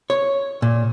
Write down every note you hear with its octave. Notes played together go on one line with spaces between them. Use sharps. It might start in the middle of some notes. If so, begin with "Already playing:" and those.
C#5
A#2